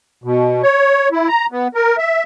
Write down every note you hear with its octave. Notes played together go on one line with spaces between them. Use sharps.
B2
C#5
E4
A#5
B3
A#4
E5